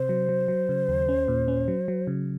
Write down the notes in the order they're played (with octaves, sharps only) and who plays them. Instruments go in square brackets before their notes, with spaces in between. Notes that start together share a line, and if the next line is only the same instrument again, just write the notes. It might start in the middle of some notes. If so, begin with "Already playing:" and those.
Already playing: [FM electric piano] C3 [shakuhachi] C5
[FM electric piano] F#3
F#3
F#3
C#3
D#2
C#4
A#2
C#4
F#3
F#3
C#3